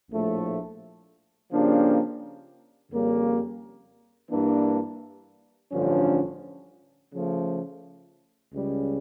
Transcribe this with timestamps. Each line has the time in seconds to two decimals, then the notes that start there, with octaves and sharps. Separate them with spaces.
0.11 A#1 A2 F3 A3
1.51 C#3 F3 A#3 D4 G4
2.91 F2 C#3 G3 A#3 C#4
4.31 G2 E3 A#3 D4
5.71 A1 G2 D3 F3 C#4
7.12 C#3 F3 A3
8.51 C#2 C#3 G3